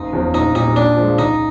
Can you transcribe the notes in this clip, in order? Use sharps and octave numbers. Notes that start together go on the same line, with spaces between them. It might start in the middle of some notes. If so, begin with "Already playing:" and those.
Already playing: F#1 D#4
E2 C#3 F3
A#1 D#4
A#2 G3 D#4
A#2 D4
F3 G#3
C#2 D#4